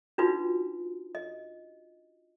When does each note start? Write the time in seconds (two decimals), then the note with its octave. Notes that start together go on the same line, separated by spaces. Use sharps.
0.18 D4 D#4 F4 F#4 B4
1.15 D#5